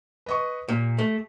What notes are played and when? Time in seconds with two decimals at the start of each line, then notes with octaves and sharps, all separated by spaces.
0.26 B4 D#5 C#6
0.68 A#2 G4
0.98 A3